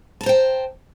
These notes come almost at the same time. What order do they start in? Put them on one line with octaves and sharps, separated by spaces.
A5 A#5 C5 G5